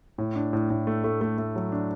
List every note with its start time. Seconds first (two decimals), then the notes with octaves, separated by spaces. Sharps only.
0.18 A2
0.36 D4
0.53 A2
0.70 A2
0.87 A3
1.04 A3
1.21 A3
1.38 A3
1.56 F#3
1.72 D4